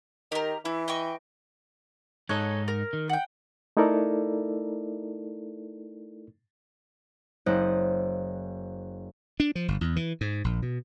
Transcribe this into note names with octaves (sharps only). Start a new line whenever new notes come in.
D#3 G4 A#4
E3 E4
D#5 G5 C#6
G#2 D#4 A4 C#5 D#5 F#6
A#4
D#3
F#5 G5
A3 D#4 E4 A4 A#4 D5
F#1 C5 D#5 F#6
D4
F3
G1
E2
E3
G#2
A#1
B2